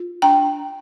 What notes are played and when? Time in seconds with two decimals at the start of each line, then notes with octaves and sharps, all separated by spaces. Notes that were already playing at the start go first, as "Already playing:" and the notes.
Already playing: F4
0.22 D4 G5 A#5